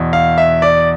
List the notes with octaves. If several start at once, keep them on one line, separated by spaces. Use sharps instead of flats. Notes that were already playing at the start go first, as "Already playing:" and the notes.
Already playing: E2 B2
F5
E5
D5